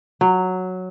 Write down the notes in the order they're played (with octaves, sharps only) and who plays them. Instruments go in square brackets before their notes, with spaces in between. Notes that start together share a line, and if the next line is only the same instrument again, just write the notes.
[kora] F#3